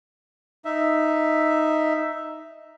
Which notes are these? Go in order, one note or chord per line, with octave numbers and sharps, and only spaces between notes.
D#4 E5